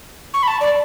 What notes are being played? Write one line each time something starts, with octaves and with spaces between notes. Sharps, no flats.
C#6
B5
A5
D5